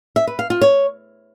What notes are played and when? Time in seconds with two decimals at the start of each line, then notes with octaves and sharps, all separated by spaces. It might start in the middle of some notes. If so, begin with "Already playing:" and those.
0.16 E5
0.27 B4
0.39 F5
0.50 F4
0.62 C#5